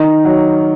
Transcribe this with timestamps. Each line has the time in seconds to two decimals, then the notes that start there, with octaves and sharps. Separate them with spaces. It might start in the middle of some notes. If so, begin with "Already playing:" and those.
Already playing: D#3 D#4
0.25 F#3